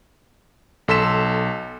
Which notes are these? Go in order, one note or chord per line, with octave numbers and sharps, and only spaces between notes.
B1 A4 C6 B6 E7